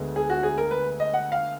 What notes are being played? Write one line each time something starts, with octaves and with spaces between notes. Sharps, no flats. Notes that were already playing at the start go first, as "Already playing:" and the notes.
Already playing: D2 D3 G#3 B3 D4
G#4
F#4
G#4
A#4
B4
D#5
F#5
F5